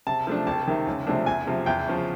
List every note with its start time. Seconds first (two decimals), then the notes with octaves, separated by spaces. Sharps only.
0.07 C3 A5
0.27 F3 A3 D4
0.47 C2 A5
0.67 C3 D#3
0.87 C#2
1.07 C3 F3 A3 D4
1.26 E2 G#5
1.47 C3 F3
1.66 E2 G5
1.87 C#3 F3